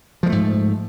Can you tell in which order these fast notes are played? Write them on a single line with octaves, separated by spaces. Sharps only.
F3 G#3 A3 G#2